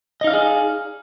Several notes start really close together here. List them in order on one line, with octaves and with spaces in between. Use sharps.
D#5 D#4 F5 D5 G#4